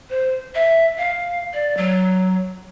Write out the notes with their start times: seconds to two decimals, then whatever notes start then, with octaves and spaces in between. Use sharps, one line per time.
0.10 C5
0.55 E5
0.98 F5
1.54 D5
1.77 F#3